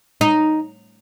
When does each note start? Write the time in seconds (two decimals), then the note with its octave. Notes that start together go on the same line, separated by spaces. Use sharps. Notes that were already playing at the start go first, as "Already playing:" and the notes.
0.21 D#4